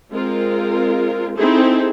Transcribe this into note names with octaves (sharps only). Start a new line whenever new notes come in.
G#3 C4 F4 A#4
C4 D#4 E4 G#4 A4 C5